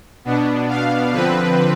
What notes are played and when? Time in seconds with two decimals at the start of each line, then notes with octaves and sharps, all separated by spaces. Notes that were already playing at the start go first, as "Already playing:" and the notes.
0.25 B2 B3 D4
0.69 F5
1.12 D3 F3 C4 B4